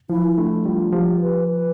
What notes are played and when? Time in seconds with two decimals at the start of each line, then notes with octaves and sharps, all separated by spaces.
0.09 F3 E4
0.38 A3 D4
0.65 G3 F4
0.93 F3 G4
1.21 B4
1.48 B4